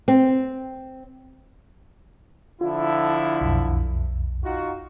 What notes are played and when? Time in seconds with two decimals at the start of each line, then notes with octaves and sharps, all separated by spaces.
0.08 C4
2.61 D3 F3 E4 F4
3.41 B1 F2
4.43 D#4 F4 F#4